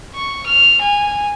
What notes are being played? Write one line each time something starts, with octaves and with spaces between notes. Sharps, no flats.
C#6
F6
G#5